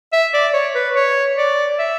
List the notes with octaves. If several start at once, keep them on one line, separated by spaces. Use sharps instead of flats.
E5
D5
C#5
B4
C#5
D5
E5